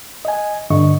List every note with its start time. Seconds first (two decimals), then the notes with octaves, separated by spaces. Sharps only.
0.25 D#5 G#5
0.70 G2 D3 D#5 C#6